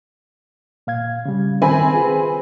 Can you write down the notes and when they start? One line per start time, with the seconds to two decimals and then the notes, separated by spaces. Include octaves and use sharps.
0.87 A#2 F5 G#6
1.25 C#3 G3
1.62 D#3 C4 A#4 G#5 B5
1.92 F4 G#4 B4